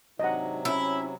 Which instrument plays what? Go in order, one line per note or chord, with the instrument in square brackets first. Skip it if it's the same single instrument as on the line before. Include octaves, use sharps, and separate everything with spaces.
[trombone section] G#1 D4 D#4 [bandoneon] C3 F#3 [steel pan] D#5 F#5
[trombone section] C#4 [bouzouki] E4